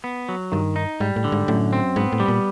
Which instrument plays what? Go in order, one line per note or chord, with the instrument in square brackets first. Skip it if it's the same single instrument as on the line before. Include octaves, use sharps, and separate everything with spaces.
[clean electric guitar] B3
F#3
[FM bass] G2 [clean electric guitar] D#3
[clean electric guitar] D#4
[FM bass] G#2 [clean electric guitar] G3
[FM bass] A2
[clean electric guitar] D3
[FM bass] G#2
[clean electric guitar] F#2 [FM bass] A2
[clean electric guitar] C4
[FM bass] G#2 [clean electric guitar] B3
[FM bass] A2
[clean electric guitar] G3
[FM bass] A#2